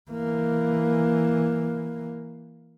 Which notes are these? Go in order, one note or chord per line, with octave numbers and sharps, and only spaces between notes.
E3 A#3